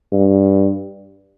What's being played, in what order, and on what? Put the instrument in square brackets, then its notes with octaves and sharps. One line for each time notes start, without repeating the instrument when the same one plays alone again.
[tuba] G2